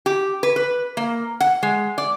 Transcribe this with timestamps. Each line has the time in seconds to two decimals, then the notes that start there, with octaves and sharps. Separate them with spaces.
0.06 G4
0.43 B4
0.56 B4
0.97 A#3
1.40 F#5
1.63 G#3
1.98 D5